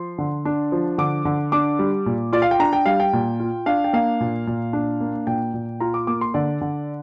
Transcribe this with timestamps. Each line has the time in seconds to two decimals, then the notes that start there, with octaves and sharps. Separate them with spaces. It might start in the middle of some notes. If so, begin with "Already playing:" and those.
Already playing: F3 C6
0.18 D3
0.45 D4
0.72 F3
0.98 D3 D6
1.25 D3
1.52 D4 D6
1.79 G3
2.06 A#2
2.33 F4 D5
2.42 F5
2.51 G5
2.60 D4 A#5
2.73 G5
2.86 G3 F5
3.00 G5
3.13 A#2
3.40 F4
3.66 D4 F5
3.84 G5
3.93 A#3 F5
4.21 A#2
4.47 A#2
4.73 D4
5.01 A#3
5.27 A#2 G5
5.54 A#2
5.80 F4 A#5
5.94 D6
6.07 A#3 D6
6.21 C6
6.34 D3 D5
6.61 D3